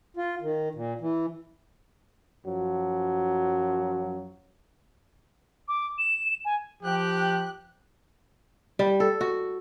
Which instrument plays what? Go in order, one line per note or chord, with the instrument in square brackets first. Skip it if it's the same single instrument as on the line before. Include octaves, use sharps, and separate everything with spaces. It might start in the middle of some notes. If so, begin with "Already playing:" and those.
[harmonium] F4
D#3
A#2
E3
[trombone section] F#2 F3 F#3
[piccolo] D6
E7
G#5
[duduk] F3 [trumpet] G4 [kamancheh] G5 F#6
[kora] G3
A4
F#4